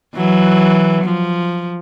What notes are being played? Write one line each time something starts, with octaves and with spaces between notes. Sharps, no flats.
E3 F#3
F3